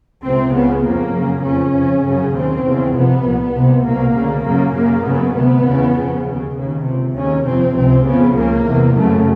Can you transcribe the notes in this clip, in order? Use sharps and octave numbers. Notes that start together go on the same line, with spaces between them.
C#2 C3 C4
C#2 C#3 B3
F2 C#3 A#3
F#2 C#3
F2 C#3 C#4
F2 C#3
F#2 C#3
D#2 C#3 C4
E2 C#3
F2 C3 B3
C2 A#2
C2 C3
C2 B2 A#3
D2 C#3
F#2 C#3 A#3
F#2 C#3 A#3
F#2 C#3 B3
D2 C3 B3
E2 C#3
F2 C#3
D#2 C#3
D#2 C#3
C#2 C3
D#2 C#3 C#4
F2 C3 C4
C#2 C3 C4
F2 C#3 B3
C#2 C#3 A#3
E2 C3
F#2 C#3 A3